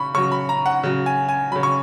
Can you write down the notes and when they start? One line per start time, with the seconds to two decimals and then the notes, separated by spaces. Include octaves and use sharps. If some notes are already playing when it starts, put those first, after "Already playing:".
Already playing: C#3 B5 C#6
0.14 C#3 F#3 C#6
0.32 B5
0.49 A#5
0.66 F#5
0.83 C#3 F#3
1.06 G#5
1.29 G#5
1.51 C#3 F#3 B5
1.63 C#6